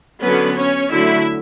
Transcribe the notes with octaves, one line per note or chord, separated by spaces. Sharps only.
D3 F#3 B3 C#4 B4
C#4 C#5
D3 F#3 A3 E4 E5